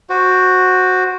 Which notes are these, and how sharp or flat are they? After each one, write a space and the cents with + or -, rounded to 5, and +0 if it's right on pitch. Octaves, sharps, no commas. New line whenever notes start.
F#4 -5 C5 +0 D6 +0